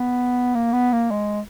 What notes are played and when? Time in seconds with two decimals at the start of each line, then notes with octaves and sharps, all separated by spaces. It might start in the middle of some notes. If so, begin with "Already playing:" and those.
Already playing: B3
0.55 A#3
0.73 B3
0.92 A#3
1.11 G#3